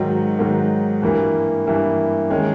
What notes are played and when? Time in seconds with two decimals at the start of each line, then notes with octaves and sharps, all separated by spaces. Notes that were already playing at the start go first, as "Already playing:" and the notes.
Already playing: G#2 D#3 F#3
0.39 G#2 D#3 F#3
1.02 G2 E3 G3 A#3
1.67 G2 E3 G3 A#3
2.30 D#3 G#3 C#4